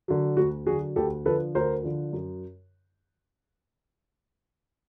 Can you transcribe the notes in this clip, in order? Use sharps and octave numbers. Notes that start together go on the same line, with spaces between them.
D3 F#3
D2 F#4
D3 F#3 F#4 G#4
D2 G4 A4
D3 F3 A4 B4
D2 A#4 C5
D3 F3
F#2